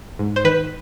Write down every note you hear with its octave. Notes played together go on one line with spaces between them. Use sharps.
G#2
C5
D#3 B4